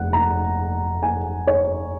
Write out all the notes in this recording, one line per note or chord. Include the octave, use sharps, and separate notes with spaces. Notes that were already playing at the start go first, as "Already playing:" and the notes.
Already playing: F1 F#5
A#5
G#5
C#5